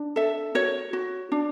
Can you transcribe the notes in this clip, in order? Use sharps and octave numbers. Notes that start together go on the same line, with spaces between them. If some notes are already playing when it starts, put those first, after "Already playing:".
Already playing: D4
A4 E5
F#4 C#5
F#4
D4